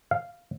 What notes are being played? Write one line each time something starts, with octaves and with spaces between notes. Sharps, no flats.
F5